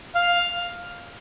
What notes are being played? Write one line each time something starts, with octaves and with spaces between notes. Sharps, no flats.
F5